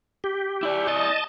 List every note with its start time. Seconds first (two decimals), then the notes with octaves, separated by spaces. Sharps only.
0.24 G4
0.63 E4 D5
0.88 D#5 A5